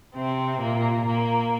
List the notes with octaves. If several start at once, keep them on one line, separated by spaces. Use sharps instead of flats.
C3 C4
A#2 A#3
A#2 A#3